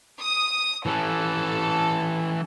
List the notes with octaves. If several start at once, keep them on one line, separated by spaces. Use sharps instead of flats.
D#6
E3 C#4 A4